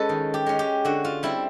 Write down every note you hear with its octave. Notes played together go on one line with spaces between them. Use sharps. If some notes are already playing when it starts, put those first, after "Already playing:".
Already playing: G#3 C#4 A4 B4
D#3
G4
G#3 C#4
G4
D3 F#4
F4
G3 C4 E4